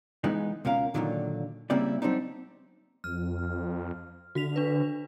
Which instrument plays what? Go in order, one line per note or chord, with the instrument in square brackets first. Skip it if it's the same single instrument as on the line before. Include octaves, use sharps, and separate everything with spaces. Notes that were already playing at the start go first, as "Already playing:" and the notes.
[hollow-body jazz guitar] E3 G#3 B3 D#4
C#2 B2 C#4 A#4 F5
A#2 D3 D#3 F#3 G#3 A#3
C#3 G3 A#3 C4 E4 D5
F#3 G3 C4 D4 D#4
[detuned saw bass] F2 [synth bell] F6
[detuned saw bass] D3 [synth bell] F#4 B6 F7
[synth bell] D4 B4